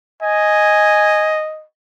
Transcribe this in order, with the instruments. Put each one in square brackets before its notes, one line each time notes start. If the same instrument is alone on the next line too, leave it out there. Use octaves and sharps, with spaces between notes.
[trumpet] D#5 [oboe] G#5